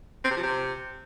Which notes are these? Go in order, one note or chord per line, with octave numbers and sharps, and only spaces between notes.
C4
C3
F3
C3